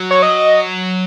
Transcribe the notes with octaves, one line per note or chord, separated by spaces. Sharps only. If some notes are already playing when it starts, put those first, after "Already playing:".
Already playing: F#3
C#5
D#5